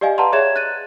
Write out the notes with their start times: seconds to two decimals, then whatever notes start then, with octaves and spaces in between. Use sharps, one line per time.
0.01 G4 D5 D#5 F5 G#5
0.18 B4 D5 F#5 A5 A#5 C6
0.32 G#4 C#5 E5 G#6 E7
0.56 F#6 A6 D#7